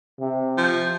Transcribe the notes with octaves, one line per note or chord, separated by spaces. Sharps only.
C3
F3